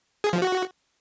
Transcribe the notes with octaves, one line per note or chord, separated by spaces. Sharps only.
G#4
F3
F#4